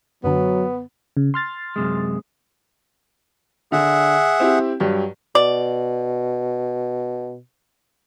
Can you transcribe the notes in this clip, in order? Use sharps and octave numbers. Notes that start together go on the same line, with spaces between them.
F#2 D3 F#3 B3
C#3
C6 F6 A6
F#2 C3 G#3
D3 G#4 E5 F#5
C4 E4 G4
G2 F#3 G4
B2 D5